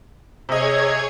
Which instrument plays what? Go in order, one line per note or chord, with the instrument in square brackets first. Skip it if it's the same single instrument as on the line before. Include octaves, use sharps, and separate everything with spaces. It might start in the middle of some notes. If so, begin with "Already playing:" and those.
[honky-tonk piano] C3 D#5 [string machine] G#4 C#5 G#6